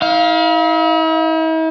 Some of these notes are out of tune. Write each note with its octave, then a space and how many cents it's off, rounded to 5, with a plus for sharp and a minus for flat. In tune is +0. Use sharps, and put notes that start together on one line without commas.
E4 -45 F5 +0